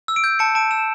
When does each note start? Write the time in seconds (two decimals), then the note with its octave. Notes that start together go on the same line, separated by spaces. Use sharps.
0.08 E6
0.16 D7
0.24 G6
0.39 A5 C#7
0.55 A5 D7
0.71 E6 E7